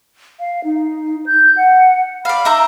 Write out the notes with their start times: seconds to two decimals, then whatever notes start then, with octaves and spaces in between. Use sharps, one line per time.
0.40 F5
0.64 D#4
1.26 G6
1.56 F#5
2.25 D5 F5 B5
2.45 D#4 E5 A#5